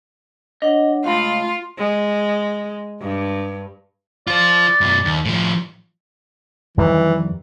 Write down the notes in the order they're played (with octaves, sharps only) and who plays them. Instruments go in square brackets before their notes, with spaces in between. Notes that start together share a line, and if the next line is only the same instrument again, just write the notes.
[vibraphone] D4 C#5 F#5 [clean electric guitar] D#5
[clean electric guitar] C#2 B5 [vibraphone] A3 F5 [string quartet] F4
[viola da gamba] G#3
G2
[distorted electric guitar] F4 C5 [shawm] D5
[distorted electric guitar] F#2 B2
D#2
A2 F3
[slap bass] F2 D#3 G3 [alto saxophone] E3